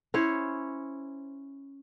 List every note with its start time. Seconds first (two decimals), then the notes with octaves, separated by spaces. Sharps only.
0.14 C#4 E4 C5 C#5